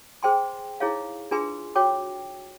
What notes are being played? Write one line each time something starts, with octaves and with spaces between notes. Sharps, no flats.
G#4 C5 G5 G#5 C6
D#4 E4 G#4 C#5 F5
D4 F4 G#4 B4 G#5 C6
F#4 C#5 G5 D6